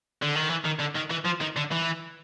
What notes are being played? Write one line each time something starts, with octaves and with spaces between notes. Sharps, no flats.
D3
D#3
E3
D#3
D3
D#3
E3
F3
D#3
D3
E3